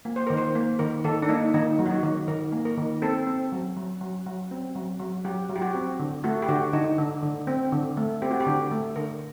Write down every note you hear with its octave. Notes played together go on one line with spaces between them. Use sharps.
A#3
C5
D#3 A#4
C5
A#3
D#3 A#4
D#3 A4
D4
A#3 D#4
D#3 D#4
F#3
F#4
D#4
D#3
D#3 A#4
A#3
A#4
D#3
C4 A4
C4
F#3
F#3
F#3
F#3
C4
F#3
F#3
F#3 G4
F#3
G4
F#4
C4
D3
A3 F#4
G4
D3 F#4
D3 D#4
D3
D3
C4
D3
A3
C4 G4
F#4
G4
D3
A3
D3 A#4